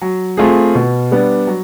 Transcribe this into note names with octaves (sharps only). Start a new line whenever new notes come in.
F#3
A3 C4 F4 G#4
B2
G3 B3 D4
F#3